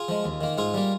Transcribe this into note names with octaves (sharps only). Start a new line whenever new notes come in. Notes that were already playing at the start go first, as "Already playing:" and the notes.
Already playing: F4 G#4
F3 G#3
D#2
D#3 A#3
G#2 F4 G#4
G3 A#3